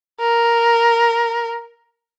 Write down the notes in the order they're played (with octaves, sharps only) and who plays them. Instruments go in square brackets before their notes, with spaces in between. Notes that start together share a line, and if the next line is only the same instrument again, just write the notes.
[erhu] A#4